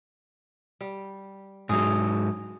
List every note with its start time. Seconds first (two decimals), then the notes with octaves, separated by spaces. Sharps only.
0.81 G3
1.69 G#2 F#3 G#4